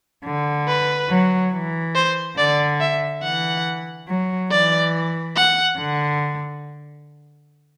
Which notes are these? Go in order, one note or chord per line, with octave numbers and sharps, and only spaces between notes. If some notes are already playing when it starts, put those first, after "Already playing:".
D3
B4
F#3
E3
C5
D3 D5
E5
E3 F#5
F#3
E3 D5
F#5
D3